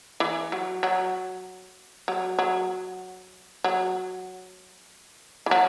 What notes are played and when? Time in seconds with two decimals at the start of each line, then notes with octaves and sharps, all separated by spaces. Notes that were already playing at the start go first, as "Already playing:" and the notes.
0.20 E3
0.52 F#3
0.83 F#3
2.08 F#3
2.39 F#3
3.64 F#3
5.46 E3
5.51 F#3